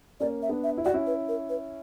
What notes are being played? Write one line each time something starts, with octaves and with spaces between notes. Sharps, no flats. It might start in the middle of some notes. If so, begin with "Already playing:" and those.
A#3 C#4 D5
E5
B3 D4
E5
E4
F#4 D5
C#4 E4
B4
A#4
B4